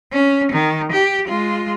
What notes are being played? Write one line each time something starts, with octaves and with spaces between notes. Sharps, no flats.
C#4
D#3
G4
G#3 F4